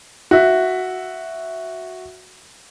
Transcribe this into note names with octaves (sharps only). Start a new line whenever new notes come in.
F#4 E5